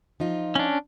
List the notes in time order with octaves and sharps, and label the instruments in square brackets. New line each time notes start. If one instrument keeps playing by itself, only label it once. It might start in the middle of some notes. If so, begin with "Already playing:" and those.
[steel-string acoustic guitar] F3 D#4 F4
[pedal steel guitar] C#4 D4